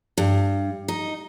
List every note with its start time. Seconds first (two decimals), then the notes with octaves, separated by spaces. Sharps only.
0.17 G2
0.88 D#4